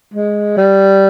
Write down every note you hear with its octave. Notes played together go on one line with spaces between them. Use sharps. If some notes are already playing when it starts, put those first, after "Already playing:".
G#3
G3